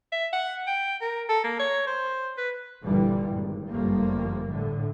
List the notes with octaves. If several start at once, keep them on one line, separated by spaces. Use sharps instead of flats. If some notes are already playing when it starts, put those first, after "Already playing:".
E5
F#5
G5
A#4
A4
A#3
C#5
C5
B4
G1 G2 A#2 D3 E3 G3
G#1
G1 F#2 F3 G3 A3 A#3
A2 D3